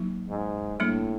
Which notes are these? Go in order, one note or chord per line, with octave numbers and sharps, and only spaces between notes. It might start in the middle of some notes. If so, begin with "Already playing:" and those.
Already playing: F#3 A#3 D#4
G#2
A2 G3 A#3 D4